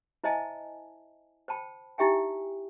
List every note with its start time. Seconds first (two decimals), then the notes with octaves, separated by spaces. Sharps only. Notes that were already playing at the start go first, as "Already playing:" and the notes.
0.24 E4 C5 D#5 E5 G#5 A5
1.48 C5 G5 A5 B5
1.98 D#4 E4 G4 E5 G5 G#5